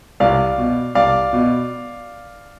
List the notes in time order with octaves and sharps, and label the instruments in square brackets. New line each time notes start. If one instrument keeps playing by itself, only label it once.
[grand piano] C2 D5 F5
B2
C2 D5 F5
B2